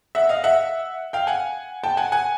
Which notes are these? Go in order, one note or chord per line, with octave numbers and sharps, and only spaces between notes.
E5 F#5
D#5 F5
E5 F#5
F5 G5
F#5 G#5
G5 A5
F#5 G#5
F#5 G#5